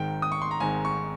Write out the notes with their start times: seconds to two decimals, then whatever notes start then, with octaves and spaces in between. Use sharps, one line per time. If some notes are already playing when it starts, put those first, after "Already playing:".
Already playing: G#1 G#2 D#3 G5
0.22 D#6
0.32 C#6
0.42 C6
0.51 A#5
0.60 G#1 G#2 D#3 G#5
0.85 C#6